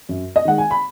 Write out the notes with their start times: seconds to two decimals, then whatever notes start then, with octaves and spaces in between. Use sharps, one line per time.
0.09 F#2
0.36 D#5
0.45 D#3 G#3 F#5
0.58 G#5
0.71 B5